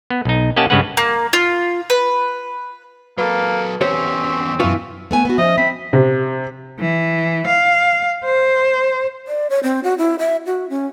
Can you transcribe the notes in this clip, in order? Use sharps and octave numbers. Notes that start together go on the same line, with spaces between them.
B3
B1 D#4
A#3 C#4 G4 D#5 F#5 A5
G2 C#3 G#3 C#4 B4 F#5
A#3
F4
B4
F#3 A#3 A4 B4
E2 C4 C#4 G4 C5 C#5
F#2 B2 E3 F4 B4 C#6
A3 B3 G#5
B3 F#4
F3 C#4 D#5 E5
C4 B5
C3
E3
F5
C5
D5
C#5
C4
F#4
E4
E5
F#4
C#4